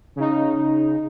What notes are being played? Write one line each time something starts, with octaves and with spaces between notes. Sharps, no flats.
C#3 D#4